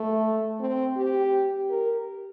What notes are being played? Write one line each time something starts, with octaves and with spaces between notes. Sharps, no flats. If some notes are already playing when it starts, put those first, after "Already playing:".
Already playing: A3
C4
G4
A#4